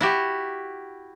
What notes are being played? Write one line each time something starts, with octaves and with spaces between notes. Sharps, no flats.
E4 F#4 G4